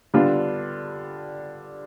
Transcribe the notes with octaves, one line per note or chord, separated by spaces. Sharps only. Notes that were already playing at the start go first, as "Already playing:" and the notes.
D3 G3 B3 D4 F4